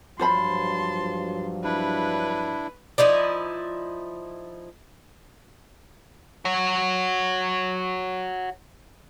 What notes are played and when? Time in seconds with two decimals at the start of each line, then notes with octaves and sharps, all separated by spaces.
0.19 G2 F3 F#3 F4 C5 A5 B5 C6
1.64 D4 E4 B4
2.98 F3 D#4 E4 D5
6.45 F#4 C#5